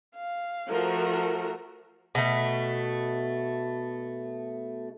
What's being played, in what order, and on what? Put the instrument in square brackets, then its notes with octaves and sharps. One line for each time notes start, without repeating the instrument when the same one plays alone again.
[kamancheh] F5
[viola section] F3 A#4 [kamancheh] A3 F#4
[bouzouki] B2 A3